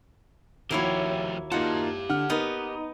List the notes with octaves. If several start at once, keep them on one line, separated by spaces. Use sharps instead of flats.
D#2 F3 A#3 E4 F#4 G4 C#5
A#3 D#4 F4 G4 F#5 A5
D3 F#5 F6
B3 D#4 A#4 B4